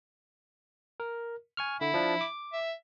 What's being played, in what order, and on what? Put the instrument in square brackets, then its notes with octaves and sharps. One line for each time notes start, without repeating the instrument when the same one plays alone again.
[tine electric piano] A#4
G#5 C#6 F6
[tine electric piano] D3 [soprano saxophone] E4
[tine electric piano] F3 D4
D6
[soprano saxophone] E5